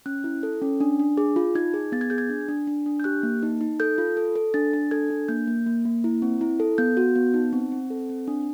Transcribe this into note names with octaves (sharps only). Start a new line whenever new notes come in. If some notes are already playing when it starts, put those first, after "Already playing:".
C#4 F#6
E4
A4
C#4
D4
D4
G#4
F4
D#4 G#6
G#4
B3 A6
G#6
G#4 G6
G#6
D4
D4
D4
D4
G6
G4 F#6
A#3
D#4
D#4
A4 G6
F4
A4
A4
D4 A6
D4
A4 G#6
D4
A#3 G6
A#3
A#3
A#3
E4
C4
E4
A4
B3 G6
F#4
B3
D#4
C4
C4
A4
C4
D4